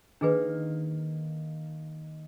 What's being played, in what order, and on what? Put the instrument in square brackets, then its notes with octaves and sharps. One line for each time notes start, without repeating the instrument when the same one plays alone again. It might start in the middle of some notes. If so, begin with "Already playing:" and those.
[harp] D#3 A#3 [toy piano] D4 G#4 B4